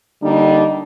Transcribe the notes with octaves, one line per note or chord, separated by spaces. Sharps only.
D3 G3 A#3 D4 D#4